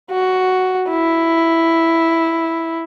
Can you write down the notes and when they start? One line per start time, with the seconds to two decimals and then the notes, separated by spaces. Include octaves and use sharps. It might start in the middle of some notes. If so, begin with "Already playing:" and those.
0.11 F#4
0.90 E4